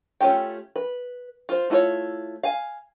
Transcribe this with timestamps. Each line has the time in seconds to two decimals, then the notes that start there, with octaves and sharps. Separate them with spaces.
0.21 A3 C#4 F4 G4 G5
0.76 B4
1.49 F4 C5
1.70 A3 E4 F4 A4 C#5
2.43 F5 G#5